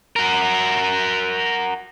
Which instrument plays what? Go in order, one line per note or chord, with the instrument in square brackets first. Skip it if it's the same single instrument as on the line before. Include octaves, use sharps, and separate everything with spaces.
[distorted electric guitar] F#4 A#4